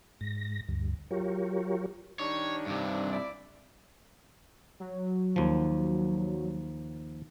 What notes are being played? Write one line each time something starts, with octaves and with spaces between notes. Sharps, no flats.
G#2 A#6
D2 G2
F#3 F4 G4 A#4 C#5
D#3 G3 D4 C#5
G2 C3
E4 D5
F#3
D#2 F3